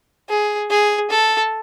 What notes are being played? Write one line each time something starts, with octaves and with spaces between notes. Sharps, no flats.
G#4
G#4
A4